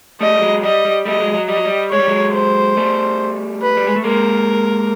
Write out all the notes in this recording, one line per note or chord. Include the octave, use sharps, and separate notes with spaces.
G3 A3 D#5
G3
F#3 G#3
G3 D#5
G3
G3 A3 D#5
F#3 G#3
F#3
G3 D#5
F#3
G3
G#3 C#5
G3
F#3 G#3
C5
G3 A3
B4
G3
G#3
A3
G#3 A#3 A#4